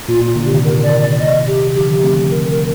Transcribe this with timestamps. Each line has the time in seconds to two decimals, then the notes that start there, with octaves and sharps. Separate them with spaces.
0.08 A#2 F4
0.22 A#2 F4
0.36 A#2 D3
0.45 C3 D#3 G4
0.64 A#4
0.82 D5
1.01 D5
1.19 D#5
1.47 G4
1.75 D3 F3 G4
2.03 A3 C4
2.30 A#4
2.50 A#4